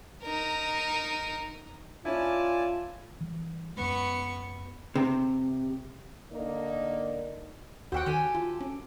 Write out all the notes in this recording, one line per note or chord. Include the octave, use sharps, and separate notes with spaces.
D#4 A#4
C#4 E4 F4 D5 G#5 A5
E3 G3
F#2 G#3 B3 C#6
C3
D3 A#3 D#4 A#4 D5
D#2 F#4 C5 E5 F#5 G5
D#3 G4 A4 G#5
F4
C#4